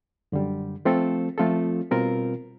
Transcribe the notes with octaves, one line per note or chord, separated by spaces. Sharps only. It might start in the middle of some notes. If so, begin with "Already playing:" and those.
F#2 D3 G3
F3 A3 C4 F4 A4
F3 A3 C4 F4 A4
B2 G3 C4 F4 A#4